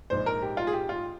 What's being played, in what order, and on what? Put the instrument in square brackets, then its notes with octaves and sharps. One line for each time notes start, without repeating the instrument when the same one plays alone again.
[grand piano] A#1 G#2 F3 C5
A#4
G4
F4
G#4
G4
F4